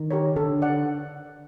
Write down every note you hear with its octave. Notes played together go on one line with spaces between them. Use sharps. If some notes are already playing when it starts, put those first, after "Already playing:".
Already playing: D#3
G4 A#4 C#5
D3 A4
D5 F#5